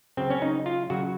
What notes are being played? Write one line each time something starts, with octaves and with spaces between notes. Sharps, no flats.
C#3 F#3 C4
C#4
D#4
F4
C#3 F#3 F#4